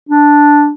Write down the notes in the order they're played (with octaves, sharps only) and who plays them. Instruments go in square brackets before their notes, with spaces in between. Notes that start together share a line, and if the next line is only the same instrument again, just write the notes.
[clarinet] D4